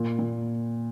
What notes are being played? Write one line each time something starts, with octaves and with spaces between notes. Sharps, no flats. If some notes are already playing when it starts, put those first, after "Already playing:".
Already playing: A#2
A#2